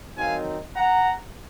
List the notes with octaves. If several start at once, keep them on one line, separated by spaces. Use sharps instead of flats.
D#3 F#3 C4 D#4 F5 G#5
F#5 A#5